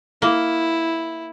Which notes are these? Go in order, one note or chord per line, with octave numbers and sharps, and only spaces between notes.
A#3 E4